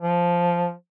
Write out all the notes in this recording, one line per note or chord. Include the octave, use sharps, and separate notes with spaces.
F3